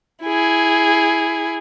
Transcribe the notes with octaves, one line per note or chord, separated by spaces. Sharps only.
E4 G#4